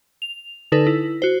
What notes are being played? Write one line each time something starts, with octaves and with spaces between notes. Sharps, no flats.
F7
D3 D#4 A4 B4
E4
F#4 C5